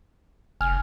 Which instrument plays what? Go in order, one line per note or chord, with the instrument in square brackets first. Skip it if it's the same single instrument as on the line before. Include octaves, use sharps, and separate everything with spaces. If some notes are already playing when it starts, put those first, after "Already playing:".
[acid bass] F1 [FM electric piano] G#5 F6